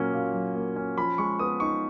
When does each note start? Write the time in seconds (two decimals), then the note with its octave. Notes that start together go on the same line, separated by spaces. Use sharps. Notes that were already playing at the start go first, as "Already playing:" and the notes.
Already playing: A#2 F#3 A#3 C#4
0.13 A#2
0.34 F#3
0.55 A#3
0.76 C#4
0.97 F3 B5
1.18 G#3 C#6
1.39 B3 D#6
1.60 D#4 C#6